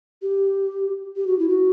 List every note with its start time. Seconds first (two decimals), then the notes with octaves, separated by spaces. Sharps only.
0.22 G4
1.16 G4
1.27 F#4
1.38 E4
1.49 F#4